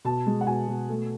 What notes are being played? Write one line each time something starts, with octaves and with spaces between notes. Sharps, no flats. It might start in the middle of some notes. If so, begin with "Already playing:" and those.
B2 A5
G#3
F#5
B2 G#5
B2
A3